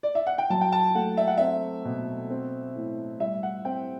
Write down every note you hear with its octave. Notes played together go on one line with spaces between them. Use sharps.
D5
E5
F#5
G5
F#3 A5
G5
A5
A3 F#5
E5
F#5
C4 E5
B2
C4
A2
G3 E5
F#5
C4 G5